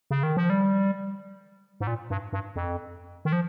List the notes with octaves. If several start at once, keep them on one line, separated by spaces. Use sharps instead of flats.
C#3
D#3
F3
G3
G#2
A#2
G2
G2
F2
D#3
F3